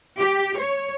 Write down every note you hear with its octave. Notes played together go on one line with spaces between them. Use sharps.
G4
C#5